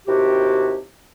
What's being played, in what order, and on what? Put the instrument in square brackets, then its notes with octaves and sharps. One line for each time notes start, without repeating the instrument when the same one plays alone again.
[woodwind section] D#2 C3 E4 F#4 G4